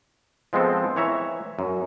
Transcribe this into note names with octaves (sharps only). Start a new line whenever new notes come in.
F3 G#3 B3 C4 A4
E3 C#5 E5 A#5
F#2